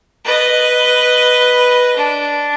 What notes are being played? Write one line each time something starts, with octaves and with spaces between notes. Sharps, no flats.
B4 D#5
D4